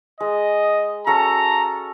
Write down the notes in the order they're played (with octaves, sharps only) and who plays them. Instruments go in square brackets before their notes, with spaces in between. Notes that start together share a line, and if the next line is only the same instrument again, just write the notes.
[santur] G#3 [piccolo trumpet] D#5
[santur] C#4 F#4 A4 [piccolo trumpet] A#5